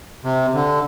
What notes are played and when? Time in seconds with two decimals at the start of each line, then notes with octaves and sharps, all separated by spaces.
0.24 C3
0.54 D3